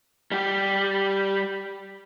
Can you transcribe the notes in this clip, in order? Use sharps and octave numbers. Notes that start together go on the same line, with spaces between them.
G3 G4